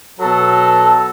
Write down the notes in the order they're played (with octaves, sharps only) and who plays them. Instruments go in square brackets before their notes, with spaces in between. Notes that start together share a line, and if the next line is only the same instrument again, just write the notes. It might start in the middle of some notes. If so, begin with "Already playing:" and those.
[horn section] B2 F#3 A4